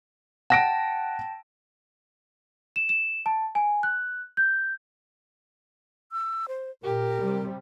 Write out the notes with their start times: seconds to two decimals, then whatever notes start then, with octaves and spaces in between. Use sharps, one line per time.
0.50 F#5 G5 A5 A#6 D7
2.76 E7
2.89 E7
3.26 A5
3.55 G#5
3.83 F#6
4.37 G6
6.12 E6
6.48 C5
6.83 A#2 G4 A#4
7.20 C3 G3